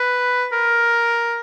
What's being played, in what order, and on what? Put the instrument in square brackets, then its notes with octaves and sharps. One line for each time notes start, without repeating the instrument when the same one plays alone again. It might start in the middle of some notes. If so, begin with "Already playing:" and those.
Already playing: [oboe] B4
A#4